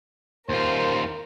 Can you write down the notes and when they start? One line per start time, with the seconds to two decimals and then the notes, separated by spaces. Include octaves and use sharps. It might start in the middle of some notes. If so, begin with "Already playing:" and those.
0.49 D#2 F4 A#4 C5